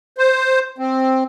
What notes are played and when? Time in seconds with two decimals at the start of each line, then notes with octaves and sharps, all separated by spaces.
0.18 C5
0.78 C4